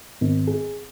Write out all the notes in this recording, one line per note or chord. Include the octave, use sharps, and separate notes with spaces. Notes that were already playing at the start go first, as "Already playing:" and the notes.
G#1
G#4